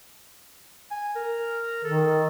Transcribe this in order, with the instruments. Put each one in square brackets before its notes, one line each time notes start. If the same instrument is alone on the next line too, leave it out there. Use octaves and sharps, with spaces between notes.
[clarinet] G#5
A#4
[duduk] D#3 [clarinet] A4